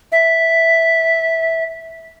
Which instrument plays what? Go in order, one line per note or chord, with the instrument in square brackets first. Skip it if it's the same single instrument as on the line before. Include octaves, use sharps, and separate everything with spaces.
[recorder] E5